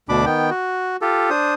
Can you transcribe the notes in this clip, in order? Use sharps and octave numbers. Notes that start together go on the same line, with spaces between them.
D2 B2 D4 B5 D6
D#3 B3 G5
F#4
F4 G4 A4
D4 C5 D#6